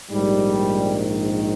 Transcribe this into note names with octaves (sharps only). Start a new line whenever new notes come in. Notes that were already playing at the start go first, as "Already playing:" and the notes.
A#1 G#2 D#3 G3